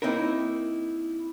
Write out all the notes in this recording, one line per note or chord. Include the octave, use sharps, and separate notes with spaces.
A#3 C4 D#4 E4 A#4